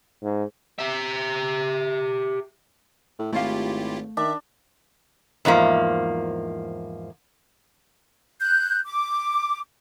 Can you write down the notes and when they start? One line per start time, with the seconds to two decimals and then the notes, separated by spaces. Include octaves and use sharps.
0.23 G#2
0.79 G4 E5
3.19 A2
3.33 G#1 A3 E4 F4 G4 F5
4.17 D#3 D4 E5
5.45 E2 G#2 F3 A#3
8.40 F#6 G6
8.85 D6